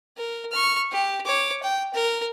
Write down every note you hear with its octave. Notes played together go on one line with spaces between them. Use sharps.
A#4
C#6 F6
G4
C#5 D6
G5
A#4